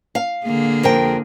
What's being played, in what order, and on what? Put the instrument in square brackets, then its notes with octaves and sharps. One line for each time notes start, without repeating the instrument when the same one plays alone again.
[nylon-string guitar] F5
[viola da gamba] D3 A#3 G#4
[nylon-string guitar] F2 A#4 G5